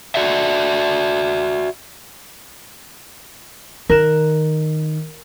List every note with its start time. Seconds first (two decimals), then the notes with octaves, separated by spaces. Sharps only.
0.15 F#4 D5 E5
3.89 D#3 A#4 F#6 E7